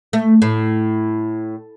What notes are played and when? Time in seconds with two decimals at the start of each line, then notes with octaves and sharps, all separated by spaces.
0.13 A3
0.42 A2